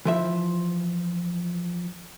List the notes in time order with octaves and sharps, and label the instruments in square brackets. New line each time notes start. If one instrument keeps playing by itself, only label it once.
[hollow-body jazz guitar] E3 F3 E5